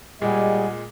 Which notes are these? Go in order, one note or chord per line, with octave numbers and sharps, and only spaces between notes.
A#2 G3 G#3 G#4 D#5 F#5 G#5